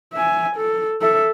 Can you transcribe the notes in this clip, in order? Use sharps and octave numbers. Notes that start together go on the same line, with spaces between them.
E5 G#5
A4
A4 E5